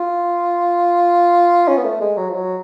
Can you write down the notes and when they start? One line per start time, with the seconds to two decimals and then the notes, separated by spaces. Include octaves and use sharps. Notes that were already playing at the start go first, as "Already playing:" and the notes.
Already playing: F4
1.68 C#4
1.77 B3
1.84 A3
2.01 G#3
2.18 F#3
2.30 F3
2.34 F#3